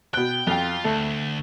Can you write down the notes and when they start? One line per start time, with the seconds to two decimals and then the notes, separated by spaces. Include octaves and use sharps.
0.14 B2 G5 F#6
0.47 F2 F4 G5
0.84 D2 A3